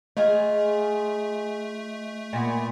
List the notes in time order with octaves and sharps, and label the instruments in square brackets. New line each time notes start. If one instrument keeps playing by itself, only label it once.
[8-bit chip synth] A3 [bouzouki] D#4 F4 G#4
[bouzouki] A#2 B3